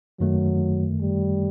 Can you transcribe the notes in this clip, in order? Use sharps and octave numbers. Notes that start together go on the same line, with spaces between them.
F#2 D#3 F#3 A3
G3